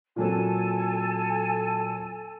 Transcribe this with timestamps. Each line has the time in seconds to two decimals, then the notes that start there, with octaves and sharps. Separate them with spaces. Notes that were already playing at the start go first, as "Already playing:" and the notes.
0.16 A#2 F#3 C4 A4 G#5 A5